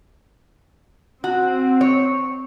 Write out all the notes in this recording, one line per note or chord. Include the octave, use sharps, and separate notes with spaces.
C4 F#4
C#5